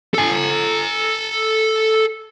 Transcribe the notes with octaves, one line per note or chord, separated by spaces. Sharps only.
A4 G#5